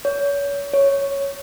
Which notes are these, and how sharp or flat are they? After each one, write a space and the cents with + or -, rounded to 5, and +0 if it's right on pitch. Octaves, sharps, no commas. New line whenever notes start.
C#5 +35
C#5 +0